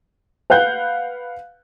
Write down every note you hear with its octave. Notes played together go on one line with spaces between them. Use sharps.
B4 F5 F#5 F#6 G6